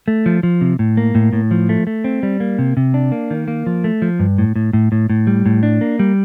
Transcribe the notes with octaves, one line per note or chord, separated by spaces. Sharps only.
A3
F3
F3
C3
A2
A#3
A2
A2
F3
A3
A3
C4
G3
A#3
C3
C3
D4
A#3
D#3
A#3
F3
A3
F3
G2
A2
A2
A2
A2
A2
G3
A2
D4
A#3
G3